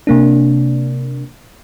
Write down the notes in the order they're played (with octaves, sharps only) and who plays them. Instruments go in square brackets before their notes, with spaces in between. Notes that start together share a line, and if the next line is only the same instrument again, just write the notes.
[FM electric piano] C3 A#3 D4